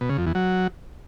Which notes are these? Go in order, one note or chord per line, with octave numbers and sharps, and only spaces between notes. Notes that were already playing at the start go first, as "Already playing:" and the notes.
B2
C#3
F2
E2
F#3